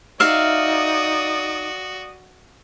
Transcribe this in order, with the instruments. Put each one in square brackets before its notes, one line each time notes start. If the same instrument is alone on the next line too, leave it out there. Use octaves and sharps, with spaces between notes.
[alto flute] D#4 [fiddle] F#4 [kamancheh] D5 D#6 [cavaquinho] E5 F5